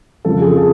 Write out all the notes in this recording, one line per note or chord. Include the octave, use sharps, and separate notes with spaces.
F2 C#3 F3 A4
G#4
A4